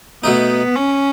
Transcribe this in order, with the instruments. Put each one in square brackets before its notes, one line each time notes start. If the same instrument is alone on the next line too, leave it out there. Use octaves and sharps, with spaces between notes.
[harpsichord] B2 A3 D#4 [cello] B3
[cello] C#4